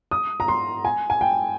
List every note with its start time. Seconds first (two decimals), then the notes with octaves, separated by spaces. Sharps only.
0.11 D#6
0.40 A#5
0.48 C6
0.85 G#5
1.10 G#5
1.21 G5